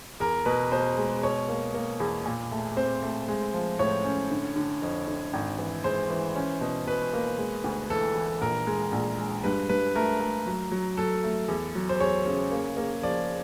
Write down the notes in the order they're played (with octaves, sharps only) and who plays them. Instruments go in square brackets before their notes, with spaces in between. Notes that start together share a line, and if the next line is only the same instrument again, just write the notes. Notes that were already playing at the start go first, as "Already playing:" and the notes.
[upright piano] E2 [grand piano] A#4
[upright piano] B2 [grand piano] B4
[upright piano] B2 [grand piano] C5
[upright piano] G#3
[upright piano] B2 [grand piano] C#5
[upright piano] A#3
A#3
E2
A#2
A3
[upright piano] C4 [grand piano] C5
[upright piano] A3
G#3
F3
[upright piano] A2 [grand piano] C#5
[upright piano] C#4
D3
D3
F2
D3
G#1
E3
[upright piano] G#3 [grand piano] C5
[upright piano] E3
C#4
B2
[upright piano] B2 [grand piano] B4
[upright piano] A#3
G#3
D2
[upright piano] E3 [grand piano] A4
[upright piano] E3
[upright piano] A#1 [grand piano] A#4
[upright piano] G#3
A#1
G#3
[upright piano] G2 [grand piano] B4
[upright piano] G2 [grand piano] B4
[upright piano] A3 [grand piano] A#4
[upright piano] A3
F#3
F#3
[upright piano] F#3 [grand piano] A4
[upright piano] A3
E2
F#3
[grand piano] C5
[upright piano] E2 [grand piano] C#5
[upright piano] C#3
A#3
A#3
[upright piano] F3 [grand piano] D5